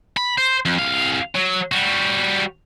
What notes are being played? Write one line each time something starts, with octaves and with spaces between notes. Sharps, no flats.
B5
C5
F2
C2 F5
F#3
G3 F#4